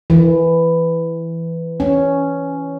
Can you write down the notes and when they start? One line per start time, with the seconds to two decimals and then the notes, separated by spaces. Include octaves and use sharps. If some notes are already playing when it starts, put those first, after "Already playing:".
0.10 E3
1.80 C#4